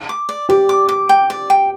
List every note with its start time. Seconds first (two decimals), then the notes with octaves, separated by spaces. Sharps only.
0.09 D6
0.29 D5
0.49 G4 D5
0.69 D6
0.89 D6
1.09 G5
1.30 D5
1.50 G5